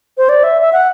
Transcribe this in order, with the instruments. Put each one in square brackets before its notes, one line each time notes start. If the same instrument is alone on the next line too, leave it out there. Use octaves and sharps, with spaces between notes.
[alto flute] C5
D5
E5
E5
F#5